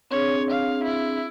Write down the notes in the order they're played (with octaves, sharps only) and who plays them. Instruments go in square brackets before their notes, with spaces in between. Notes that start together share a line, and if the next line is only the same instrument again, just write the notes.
[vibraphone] C4 D4 G#4 [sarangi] C#5
[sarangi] F5
E4